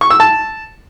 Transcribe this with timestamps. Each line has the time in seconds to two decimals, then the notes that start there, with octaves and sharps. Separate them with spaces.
0.01 C#6
0.10 E6
0.20 A5